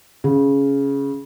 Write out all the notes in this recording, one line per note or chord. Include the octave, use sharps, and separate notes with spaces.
C#3